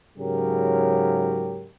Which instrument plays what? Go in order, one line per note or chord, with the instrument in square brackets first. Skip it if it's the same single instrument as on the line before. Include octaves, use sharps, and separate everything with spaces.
[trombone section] G#2 C#3 F#3 G4 A#4